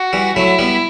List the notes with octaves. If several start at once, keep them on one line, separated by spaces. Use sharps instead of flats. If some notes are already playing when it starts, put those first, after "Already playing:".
Already playing: F#4
E3 G3
F#3 A3 E4
G3 B3